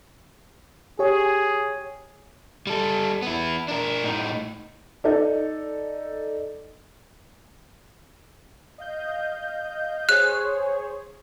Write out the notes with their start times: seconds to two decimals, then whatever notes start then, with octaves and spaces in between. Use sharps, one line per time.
0.99 G4 G#4 C#5
2.67 G3 A4
3.22 B3 E4
3.68 D4 A#4
4.04 A2 D#4
5.04 D#4 A4 D5
8.78 D#5 F5 G6
10.09 G#4 C5 C#5 F#6